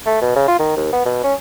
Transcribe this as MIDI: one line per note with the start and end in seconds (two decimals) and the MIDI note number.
0.06 0.19 57
0.22 0.35 47
0.36 0.48 49
0.48 0.56 65
0.59 0.74 51
0.77 0.90 39
0.93 1.05 59
1.06 1.23 47
1.24 1.34 61